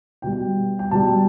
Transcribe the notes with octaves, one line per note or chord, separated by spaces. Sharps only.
B2 G3 G5
G5
B2 G3 A5